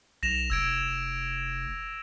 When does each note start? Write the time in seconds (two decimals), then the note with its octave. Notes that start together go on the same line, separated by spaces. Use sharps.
0.23 B1 A#6 E7 F7
0.50 F1 E6 G#6 D7